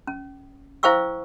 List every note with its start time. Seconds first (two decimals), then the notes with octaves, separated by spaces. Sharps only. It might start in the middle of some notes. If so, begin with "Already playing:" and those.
0.07 C#4
0.83 E4 C5 F5 G5 C#6 E6